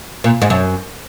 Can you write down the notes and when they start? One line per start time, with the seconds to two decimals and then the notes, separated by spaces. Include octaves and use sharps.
0.24 A#2
0.42 G#2
0.50 F#2